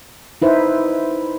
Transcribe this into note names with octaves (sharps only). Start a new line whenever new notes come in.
D#4 E4 B4 C5